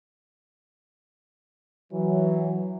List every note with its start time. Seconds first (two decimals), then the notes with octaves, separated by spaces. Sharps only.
1.93 E3 F#3